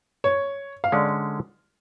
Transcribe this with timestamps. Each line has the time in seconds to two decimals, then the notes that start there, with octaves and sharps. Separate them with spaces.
0.24 C#5
0.84 F5
0.92 D3 G#3 C#4 D5